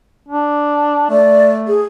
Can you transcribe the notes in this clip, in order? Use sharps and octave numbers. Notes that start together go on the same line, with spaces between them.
D4
A3 D5
G#4